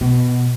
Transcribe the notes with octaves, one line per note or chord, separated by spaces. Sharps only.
B2